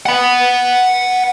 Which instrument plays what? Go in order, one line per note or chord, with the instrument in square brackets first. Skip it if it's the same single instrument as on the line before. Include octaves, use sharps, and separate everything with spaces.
[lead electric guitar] F#5 B5